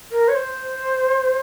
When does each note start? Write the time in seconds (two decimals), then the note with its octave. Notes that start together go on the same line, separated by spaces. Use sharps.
0.11 A#4
0.28 C#5
0.35 C5